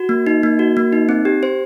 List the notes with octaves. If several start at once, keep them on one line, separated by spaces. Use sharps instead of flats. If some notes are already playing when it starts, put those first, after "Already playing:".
Already playing: F#4
A#3
D#4
A#3
F#4
A#3
D#4
C4
G4
C5